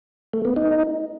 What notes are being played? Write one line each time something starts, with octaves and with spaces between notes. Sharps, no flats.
A3
B3
D#4